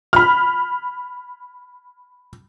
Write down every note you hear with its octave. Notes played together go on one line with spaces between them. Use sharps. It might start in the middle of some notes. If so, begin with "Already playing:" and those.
B5 F6